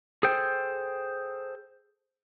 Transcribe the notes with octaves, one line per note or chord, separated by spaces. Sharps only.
G#4 A4 C5 G5